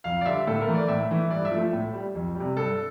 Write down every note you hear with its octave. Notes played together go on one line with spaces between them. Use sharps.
F2 F5
D5
D3 G3 E5
A2 A4
A#4
E3 A3
D5
A2 E5
E3 A3
G2 D5
E5
F3 A3
A2
G3
F2
G3
C3
G2 A4